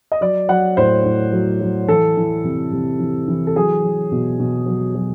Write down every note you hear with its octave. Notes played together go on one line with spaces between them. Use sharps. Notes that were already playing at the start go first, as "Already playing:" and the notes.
D#5
F#3 D5
F#3 F#5
A2 C5
A2
F#3
F#3
E3 A4
E3
C3
C3
E3
E3
A4
F#3 G#4
F#3
B2
B2
F#3
F#3